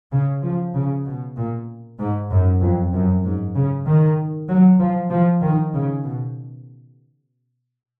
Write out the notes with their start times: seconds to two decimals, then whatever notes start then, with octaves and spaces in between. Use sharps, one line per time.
0.12 C#3
0.43 F3
0.74 C#3
1.05 B2
1.36 A#2
1.99 G#2
2.30 F#2
2.61 F2
2.92 F#2
3.24 G#2
3.55 C#3
3.86 D#3
4.48 F#3
4.79 F3
5.10 F3
5.41 D#3
5.73 C#3
6.04 B2